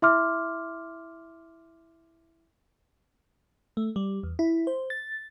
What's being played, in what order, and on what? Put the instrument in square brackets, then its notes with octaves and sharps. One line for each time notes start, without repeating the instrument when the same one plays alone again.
[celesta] E4 E5 C6 D6 F6
[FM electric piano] A3
G3
E2
E4
C5
A6